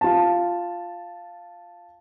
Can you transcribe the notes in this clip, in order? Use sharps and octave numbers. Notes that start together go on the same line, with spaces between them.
F4 A5